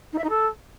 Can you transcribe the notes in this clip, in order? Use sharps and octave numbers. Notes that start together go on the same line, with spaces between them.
D#4
E5
D#4
A4